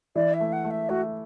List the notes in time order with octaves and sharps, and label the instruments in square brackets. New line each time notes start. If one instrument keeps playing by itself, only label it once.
[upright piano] E3 [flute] D5
[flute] E5
[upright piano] A3
[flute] F#5
[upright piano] A3
[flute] E5
[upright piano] A3 [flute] F#4